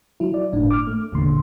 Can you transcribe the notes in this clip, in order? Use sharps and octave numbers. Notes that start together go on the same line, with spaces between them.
F#3 E4
D5
G1 A2 D4
D6 F6
A3
G#1 E2 A#2 D3 C6